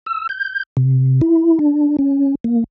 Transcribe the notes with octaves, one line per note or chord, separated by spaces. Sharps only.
E6
G6
C3
E4
D4
C#4
A#3